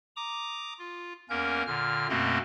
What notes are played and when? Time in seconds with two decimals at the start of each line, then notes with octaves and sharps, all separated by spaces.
0.16 A#5 D6 D#6
0.79 F4
1.30 E2 A#3 C#4 A#4 G6
1.67 A#2 D3 F6
2.09 F#2 B2 A3 A#3 C4 D#5